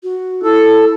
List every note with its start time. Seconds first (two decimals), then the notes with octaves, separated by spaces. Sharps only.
0.03 F#4
0.43 E4 A4